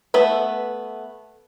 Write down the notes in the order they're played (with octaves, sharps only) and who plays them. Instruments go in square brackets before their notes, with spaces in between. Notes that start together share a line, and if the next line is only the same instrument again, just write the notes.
[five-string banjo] A3 B3 B4 E5